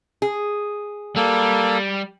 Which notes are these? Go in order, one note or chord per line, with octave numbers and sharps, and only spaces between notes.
G#4
G3 A#3 A4